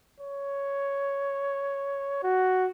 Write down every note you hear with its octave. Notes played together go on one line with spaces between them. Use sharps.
C#5
F#4